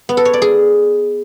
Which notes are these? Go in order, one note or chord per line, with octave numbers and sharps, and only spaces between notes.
B3
A4
C#5
D5
G#4